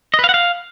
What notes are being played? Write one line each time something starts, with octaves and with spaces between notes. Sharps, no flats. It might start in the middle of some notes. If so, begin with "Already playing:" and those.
D#5
B4
F5
F#5
F5